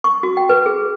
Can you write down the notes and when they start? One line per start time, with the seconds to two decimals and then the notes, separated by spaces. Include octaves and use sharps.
0.04 C#6
0.23 F#4
0.37 G5
0.49 B4
0.66 G#4